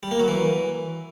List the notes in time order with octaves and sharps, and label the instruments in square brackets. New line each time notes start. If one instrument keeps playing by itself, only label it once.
[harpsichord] G3
A#3
F#3
E3